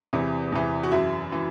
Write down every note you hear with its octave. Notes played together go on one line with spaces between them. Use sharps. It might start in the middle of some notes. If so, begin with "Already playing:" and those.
E2 C3 E3
E2 C3 E3
F#4
F#2 E3 E4
E3